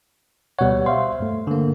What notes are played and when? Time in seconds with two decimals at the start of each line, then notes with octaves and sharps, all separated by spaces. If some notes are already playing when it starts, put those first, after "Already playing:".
0.59 D2 B2 G3 C#5 F#5
0.86 C5 E5 F5 C6
1.20 G2 A3
1.47 D3 A#3